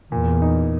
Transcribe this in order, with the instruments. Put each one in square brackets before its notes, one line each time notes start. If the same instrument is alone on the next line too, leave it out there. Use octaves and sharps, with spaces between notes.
[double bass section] E2 [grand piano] A#2
[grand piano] D#4